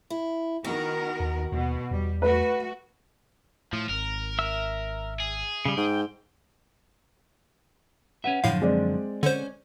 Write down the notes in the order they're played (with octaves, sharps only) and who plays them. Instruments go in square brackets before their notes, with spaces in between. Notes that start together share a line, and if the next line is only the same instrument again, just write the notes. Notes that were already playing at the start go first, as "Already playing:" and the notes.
[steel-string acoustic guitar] E4
[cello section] D#3 B3 A#4 [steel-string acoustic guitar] F#4
[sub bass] D#2
[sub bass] D#2 [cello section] B2
[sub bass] E2 [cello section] G3
[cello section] A3 F#4 [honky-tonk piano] B4
[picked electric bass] A2 [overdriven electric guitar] F3
[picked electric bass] G#1 [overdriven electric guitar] A#4
[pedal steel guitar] E5 E6
[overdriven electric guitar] G#4
[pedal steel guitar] C#3 G3
[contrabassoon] G#2 [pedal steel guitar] G5
[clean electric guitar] C#4 B4 E5 [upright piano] F#5
[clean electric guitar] F#2 D3 F3 [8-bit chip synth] A2 F5
[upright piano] G#3 C4 D5
[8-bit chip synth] D3 C5 [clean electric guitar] C#4